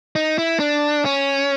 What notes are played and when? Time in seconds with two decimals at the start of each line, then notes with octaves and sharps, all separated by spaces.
0.16 D#4
0.38 E4
0.59 D4
1.05 C#4